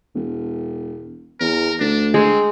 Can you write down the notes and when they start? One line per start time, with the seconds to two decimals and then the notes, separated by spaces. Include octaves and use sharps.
0.15 E1
1.40 E2 A#4
1.80 D2 D4
2.14 G#3 C4